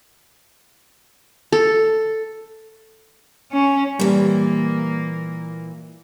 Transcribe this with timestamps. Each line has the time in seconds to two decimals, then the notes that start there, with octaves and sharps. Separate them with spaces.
1.52 A4
3.52 C#4
4.00 A#2 E3 G3 A#3